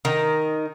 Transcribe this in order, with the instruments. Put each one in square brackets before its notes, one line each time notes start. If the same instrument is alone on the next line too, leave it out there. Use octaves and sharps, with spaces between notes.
[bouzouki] D#3